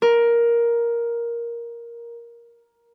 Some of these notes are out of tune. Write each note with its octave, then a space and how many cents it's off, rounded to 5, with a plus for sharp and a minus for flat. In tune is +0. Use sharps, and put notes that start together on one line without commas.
A#4 +10